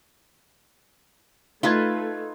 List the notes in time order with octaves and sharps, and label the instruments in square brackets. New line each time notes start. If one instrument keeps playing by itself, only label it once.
[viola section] A3 [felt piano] D#4 C6 G#6 [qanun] F4 B4 A5